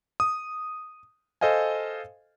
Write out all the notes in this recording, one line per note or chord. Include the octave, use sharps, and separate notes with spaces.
D#6
A4 C5 D#5 F5 G#5